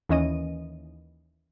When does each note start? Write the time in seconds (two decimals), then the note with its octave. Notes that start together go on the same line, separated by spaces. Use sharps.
0.09 D#2 E3 C#4 D#5 D#7